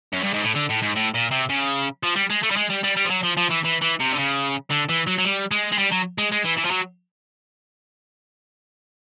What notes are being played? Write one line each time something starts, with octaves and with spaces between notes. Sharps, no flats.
F#2
G2
G#2
A2
D3
A2
G#2
A2
A#2
C3
C#3
F3
G3
G#3
A3
G3
G#3
G3
G3
G3
F3
F#3
F3
F3
E3
E3
E3
C3
D3
C#3
D3
E3
F#3
F#3
G3
G#3
G#3
G3
F#3
G#3
G#3
E3
E3
F3
F#3